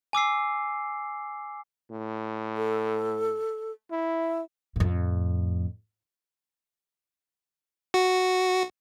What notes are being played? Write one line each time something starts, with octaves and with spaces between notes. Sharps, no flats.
G#5 D6 E6 C7
A2
A4
E4 E5
F2 A2
F#4